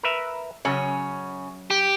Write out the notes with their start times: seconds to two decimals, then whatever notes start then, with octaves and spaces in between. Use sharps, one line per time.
0.03 A#4 B4 E5
0.65 F#2 C#3 C#4
1.71 G4